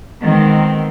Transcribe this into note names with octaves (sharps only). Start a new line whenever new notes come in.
D#3 G#3 B3 C4